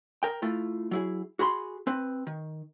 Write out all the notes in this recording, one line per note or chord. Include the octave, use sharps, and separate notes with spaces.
A#4 G5
A3 E4 F4
F#3 E4 G#4
F#4 G#4 B5 C6
C4 B4
D#3